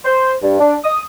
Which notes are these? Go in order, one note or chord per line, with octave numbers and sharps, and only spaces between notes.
C5
G2
D4
D#6